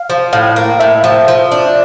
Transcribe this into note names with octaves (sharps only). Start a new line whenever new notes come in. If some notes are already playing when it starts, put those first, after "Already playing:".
Already playing: F5
F3
A2 F5
A#3
A2 E5
F3
F3
D4